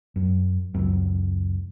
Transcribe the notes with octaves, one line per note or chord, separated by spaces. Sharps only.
F#2
C#2 F#2